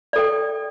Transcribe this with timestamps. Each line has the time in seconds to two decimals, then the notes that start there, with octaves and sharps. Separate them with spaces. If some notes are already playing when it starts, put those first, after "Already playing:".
0.13 D5
0.16 A4
0.18 G5